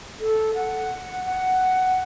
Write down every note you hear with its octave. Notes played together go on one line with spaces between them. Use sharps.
A4
F#5
F#5